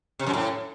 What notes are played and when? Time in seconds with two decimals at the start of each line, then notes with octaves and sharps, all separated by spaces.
0.19 C3
0.26 F#2
0.34 A2